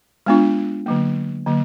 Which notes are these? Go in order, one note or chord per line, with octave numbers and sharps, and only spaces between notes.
G#3 B3 D4 F4
D3 F#3 A#3
D3 F#3 A#3